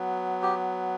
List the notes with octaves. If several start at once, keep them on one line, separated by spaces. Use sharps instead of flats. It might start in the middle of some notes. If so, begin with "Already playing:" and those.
Already playing: F#3 B3
G4